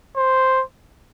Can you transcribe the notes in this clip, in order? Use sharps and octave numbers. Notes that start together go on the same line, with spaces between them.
C5